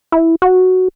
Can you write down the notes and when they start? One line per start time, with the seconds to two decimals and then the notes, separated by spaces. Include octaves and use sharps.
0.12 E4
0.42 F#4